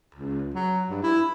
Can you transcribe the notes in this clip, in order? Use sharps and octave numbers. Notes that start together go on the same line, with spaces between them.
C#2
F#3
G2
E4